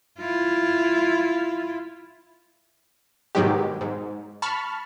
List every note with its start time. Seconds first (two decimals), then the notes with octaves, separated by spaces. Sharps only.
0.19 E4 F4
3.35 G#2 B2 D#3 F#3 G#3 G4
3.81 G#2
4.42 A5 B5 C#6 F6